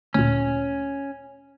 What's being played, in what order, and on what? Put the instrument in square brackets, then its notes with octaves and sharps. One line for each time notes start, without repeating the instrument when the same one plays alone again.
[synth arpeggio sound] D2 A#2 [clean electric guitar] C#4